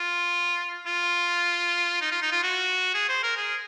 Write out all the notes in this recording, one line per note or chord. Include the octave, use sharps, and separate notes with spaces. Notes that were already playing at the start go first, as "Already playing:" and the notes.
Already playing: F4
F4
D#4
F4
D#4
F4
F#4
G#4
C5
A#4
G#4